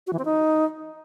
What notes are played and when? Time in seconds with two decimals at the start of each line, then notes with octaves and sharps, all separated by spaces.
0.07 F#4
0.13 E3
0.19 C4
0.25 D#4